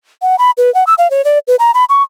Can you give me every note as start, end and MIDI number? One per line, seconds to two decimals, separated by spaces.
0.22 0.36 78
0.39 0.51 83
0.58 0.73 71
0.74 0.84 78
0.87 0.94 88
0.98 1.10 77
1.11 1.24 73
1.25 1.39 74
1.48 1.56 71
1.59 1.71 82
1.74 1.85 83
1.89 2.02 85